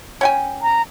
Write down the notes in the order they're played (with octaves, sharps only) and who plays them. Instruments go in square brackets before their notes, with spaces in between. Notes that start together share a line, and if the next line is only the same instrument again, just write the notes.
[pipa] C#4 G5 G#5
[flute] A#5